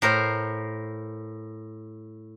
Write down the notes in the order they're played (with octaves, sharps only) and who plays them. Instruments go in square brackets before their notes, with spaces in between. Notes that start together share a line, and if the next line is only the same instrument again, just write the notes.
[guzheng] A2 A#4 C5 A#5